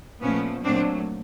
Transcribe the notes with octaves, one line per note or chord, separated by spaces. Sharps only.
A#2 F3 A3 B3 C#4
A#2 F#3 A3 C4 D4